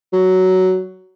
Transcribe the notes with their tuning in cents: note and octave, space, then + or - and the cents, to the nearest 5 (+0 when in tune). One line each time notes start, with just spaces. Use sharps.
F#3 +10